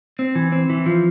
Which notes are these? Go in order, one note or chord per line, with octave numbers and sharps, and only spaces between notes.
C4
E3
C4
E3
F3